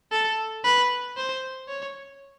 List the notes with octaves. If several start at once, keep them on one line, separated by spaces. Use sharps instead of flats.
A4
B4
C5
C#5